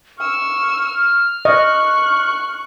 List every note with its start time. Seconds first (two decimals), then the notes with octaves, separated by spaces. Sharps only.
0.19 C#6 E6 F6
1.45 D#5 C#6 F#6